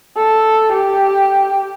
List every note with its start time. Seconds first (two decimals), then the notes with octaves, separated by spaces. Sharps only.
0.17 A4
0.72 G4